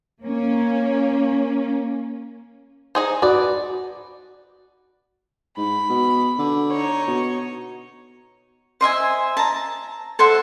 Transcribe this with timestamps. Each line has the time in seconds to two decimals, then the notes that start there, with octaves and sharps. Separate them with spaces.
0.22 A#3 C#4
2.95 D#4 G#4 C5
3.22 F#4 B4 D5
5.57 G#2 B5
5.89 B2
6.38 D3
6.71 D#4 C#5
7.07 B2
8.81 C5 D#5 E5 G#5
9.37 A5 A#5
10.19 A4 C5 E5 F#5